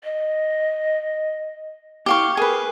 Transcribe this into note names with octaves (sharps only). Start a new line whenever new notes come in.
D#5
E4 G4 F5 C#6
G#4 A#4 B4